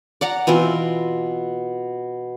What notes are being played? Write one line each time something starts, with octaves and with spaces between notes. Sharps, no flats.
D5 F#5 A#5
B2 E3 C4 F4